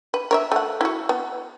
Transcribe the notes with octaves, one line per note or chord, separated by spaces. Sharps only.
B4
A#4 C#5 E5
A3 F#5
E4 F#4
B3